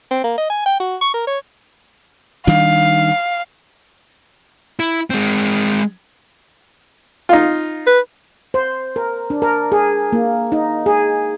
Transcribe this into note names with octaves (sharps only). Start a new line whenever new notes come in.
C4
A#3
D#5
G#5
G5
F#4
C#6
A#4
C#5
D#3 G3 D4 F5
E4
G#3 C4
D#4 F4
B4
C5
A#4
D4
A#4
G#4
A#3
D#4
G#4